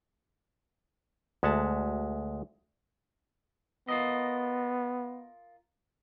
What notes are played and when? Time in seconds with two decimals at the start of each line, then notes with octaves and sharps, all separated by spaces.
1.43 D2 G#3 E5 F#5 A5
3.89 B3 F4 A#4 D#5